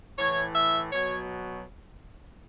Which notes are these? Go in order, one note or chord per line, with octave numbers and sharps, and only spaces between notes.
A2 E3 C#5
E5
B2 F#3 C#5